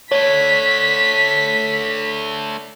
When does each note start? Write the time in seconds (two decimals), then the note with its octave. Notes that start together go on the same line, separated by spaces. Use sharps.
0.12 A3 D4 C#5 B6